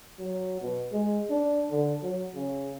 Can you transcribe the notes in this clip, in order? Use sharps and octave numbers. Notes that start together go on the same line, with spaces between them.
F#3
B2
G#3
D4
D3
F#3
C#3